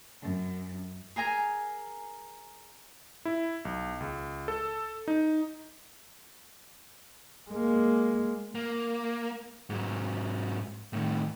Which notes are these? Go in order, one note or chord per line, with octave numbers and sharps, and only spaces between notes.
F#2
G#4 A#4 G#5 A#5
E4
B1
C#2
A4
D#4
G#3 A#3
A#3
G#2 F#3
A2 D#3